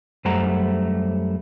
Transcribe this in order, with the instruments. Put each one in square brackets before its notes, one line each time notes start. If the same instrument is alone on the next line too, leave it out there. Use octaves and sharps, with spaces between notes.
[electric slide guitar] F#2 G3 A3 C5 F#5 A#5